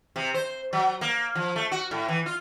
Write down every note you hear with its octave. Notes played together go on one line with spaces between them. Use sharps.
C3
C5
F#3
A#3
F3
A3
F#4
A2
E3
F4